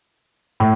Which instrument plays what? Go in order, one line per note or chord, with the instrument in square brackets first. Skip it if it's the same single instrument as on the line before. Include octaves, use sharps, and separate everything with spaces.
[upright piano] A2